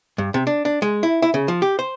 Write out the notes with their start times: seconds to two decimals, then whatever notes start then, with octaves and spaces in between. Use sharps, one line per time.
0.18 G2
0.34 C3
0.47 D4
0.65 D4
0.82 G#3
1.03 E4
1.22 E4
1.34 C#3
1.48 F3
1.62 G4
1.79 C5